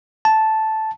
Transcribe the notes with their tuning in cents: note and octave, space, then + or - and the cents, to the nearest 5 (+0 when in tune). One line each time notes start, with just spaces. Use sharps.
A5 -5